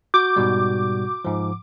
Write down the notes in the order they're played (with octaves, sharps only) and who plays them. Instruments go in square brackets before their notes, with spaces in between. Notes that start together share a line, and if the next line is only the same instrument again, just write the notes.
[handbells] F#4 G6 [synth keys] D6
[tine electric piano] G#2 B2 G3
G#2 F3